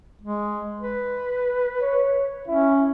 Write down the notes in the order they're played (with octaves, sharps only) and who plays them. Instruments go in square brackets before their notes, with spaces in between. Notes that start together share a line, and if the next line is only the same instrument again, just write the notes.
[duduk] G#3
B4
[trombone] C#5
[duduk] C#4 [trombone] E4